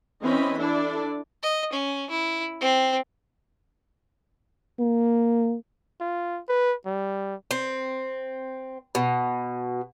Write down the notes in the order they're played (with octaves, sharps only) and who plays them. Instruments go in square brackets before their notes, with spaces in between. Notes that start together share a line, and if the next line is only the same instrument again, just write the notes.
[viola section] E3 C4 C#4 D#5 B5
D4 E4 A4 D5
[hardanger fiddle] D#5
C#4
E4
C4
[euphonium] A#3
[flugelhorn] F4
B4
G3
[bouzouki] C4
B2